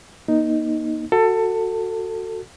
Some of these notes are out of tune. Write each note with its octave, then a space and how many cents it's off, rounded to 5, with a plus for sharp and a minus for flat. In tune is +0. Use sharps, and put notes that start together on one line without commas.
A#3 +35 D#4 +0
F#4 +0 A4 +20